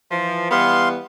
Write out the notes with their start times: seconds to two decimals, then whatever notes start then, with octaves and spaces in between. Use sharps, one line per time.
0.11 E3 F3
0.51 E3 G3 B3 F5 C6